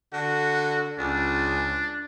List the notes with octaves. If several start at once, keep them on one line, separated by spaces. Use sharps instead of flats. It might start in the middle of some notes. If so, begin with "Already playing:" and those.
D3 F#4
C#2 D4